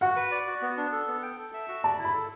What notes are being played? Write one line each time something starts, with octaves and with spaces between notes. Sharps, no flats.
F#4 F#5
B4
D5
F#4
B3
D4
A4
B3
G5
A4
E5
F#4
D5 A5
E4
B5
A4